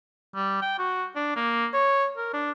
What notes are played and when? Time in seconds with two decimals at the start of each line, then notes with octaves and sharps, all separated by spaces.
0.35 G3
0.62 G5
0.78 F#4
1.16 D4
1.36 A#3
1.74 C#5
2.18 A#4
2.33 D4